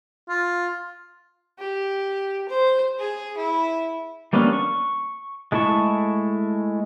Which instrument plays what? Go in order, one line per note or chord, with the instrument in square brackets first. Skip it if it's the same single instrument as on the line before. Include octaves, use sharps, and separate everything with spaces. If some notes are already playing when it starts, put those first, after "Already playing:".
[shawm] F4
[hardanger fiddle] G4
C5
G#4
E4
[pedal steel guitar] G3 A#3 B3 C#4 D4
C#6
G#3 A3 E4 A5 C#6